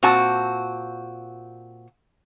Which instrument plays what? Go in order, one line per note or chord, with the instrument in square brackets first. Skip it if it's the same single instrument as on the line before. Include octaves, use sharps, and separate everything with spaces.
[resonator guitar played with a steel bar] A#2 C4 F#4 A5